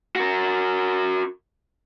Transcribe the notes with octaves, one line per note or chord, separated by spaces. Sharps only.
F#4 A#4